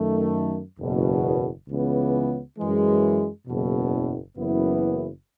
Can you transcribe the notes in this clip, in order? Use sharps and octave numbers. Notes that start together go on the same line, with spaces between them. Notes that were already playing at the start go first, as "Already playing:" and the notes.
Already playing: F#2 D#3 A3
F#1 E2 B2
C#2 C#3 E3 B3
F#2 E3 G#3
F#1 E2 B2
F#1 F#2 E3 B3 E4